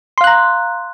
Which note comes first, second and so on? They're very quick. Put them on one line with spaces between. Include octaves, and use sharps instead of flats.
C6 F5 F#6 A#5